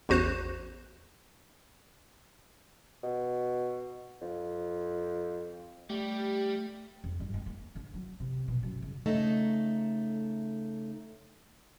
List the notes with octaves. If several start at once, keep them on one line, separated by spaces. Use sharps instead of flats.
A1 E2 F#4 C5 F#6 E7
B2
F2
G3 A3 G4
F2
G2
G#3
A#3
D3
F#3
C3
B2
F#2
C#3
C#3 A3 D#4 A4